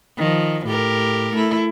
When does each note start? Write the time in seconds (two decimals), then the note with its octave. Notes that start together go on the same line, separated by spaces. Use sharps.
0.18 D#3 F3
0.65 A2 G4 A#4
1.34 A3 E4